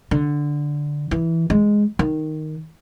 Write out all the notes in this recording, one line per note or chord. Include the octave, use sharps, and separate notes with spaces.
D3
E3
G#3
D#3